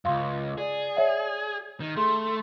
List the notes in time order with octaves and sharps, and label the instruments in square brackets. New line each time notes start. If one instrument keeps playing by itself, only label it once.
[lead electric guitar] C#2 F#2 [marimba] F5 C6
[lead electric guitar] G#4 [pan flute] D5
[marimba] C#5 E5 F#5
[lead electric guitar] D#3
[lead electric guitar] A3 [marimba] G#4 [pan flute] C6